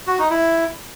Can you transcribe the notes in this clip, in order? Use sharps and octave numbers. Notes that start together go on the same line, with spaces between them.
F#4
D#4
E4